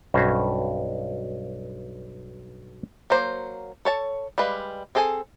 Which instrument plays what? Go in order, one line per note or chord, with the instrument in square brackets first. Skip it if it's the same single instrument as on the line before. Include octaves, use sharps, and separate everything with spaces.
[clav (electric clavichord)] B1 G2 C#4 F#4 C5
[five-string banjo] F#3 A#3 C5
A4 C#5 A5
G3 G#3 B4 F5
C4 G#4 A4 C5 G#5